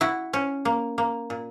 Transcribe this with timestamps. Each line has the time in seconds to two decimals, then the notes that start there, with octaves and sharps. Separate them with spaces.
0.01 E4 F#4
0.33 C#4
0.65 A#3
0.98 A#3
1.30 A#2